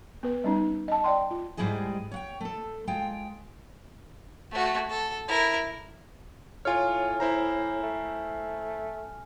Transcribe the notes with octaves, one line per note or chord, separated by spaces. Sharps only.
B3 B4
G3 C#4 D#4
D#5 A5
D5 G5 C6
F4
G#2 G3 G#3 E4 G#4 D#5
C#5 F#5 G5
A3 A4
G#3 F4 G5
A3 F#4
A4
E4 A#4
A2 F4 C#5 G#5 F6
E4 C5 A#5
A3